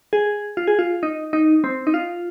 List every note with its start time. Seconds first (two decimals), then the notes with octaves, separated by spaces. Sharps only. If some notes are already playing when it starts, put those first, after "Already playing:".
0.13 G#4
0.57 F4
0.67 G#4
0.79 F4
1.03 D#4
1.33 D#4
1.64 C4
1.87 D#4
1.94 F4